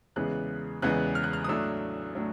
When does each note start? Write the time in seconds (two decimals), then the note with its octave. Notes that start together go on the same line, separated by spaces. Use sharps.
0.16 E2 C#3 E3 G#3 B3 F#6
0.82 E2 C#3 E3 G#3 B3 F#6
1.15 F6
1.24 F#6
1.33 F6
1.44 D#6
1.48 A2 F#3 A3 D4 E6
2.15 A2 F#3 A3 D4